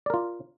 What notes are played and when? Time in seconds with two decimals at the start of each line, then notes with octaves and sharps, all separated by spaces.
0.06 D5
0.10 A#4
0.14 F4